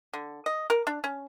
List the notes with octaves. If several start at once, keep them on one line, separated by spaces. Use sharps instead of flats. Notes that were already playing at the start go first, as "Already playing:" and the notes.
D3
D#5
A#4
D4
C#4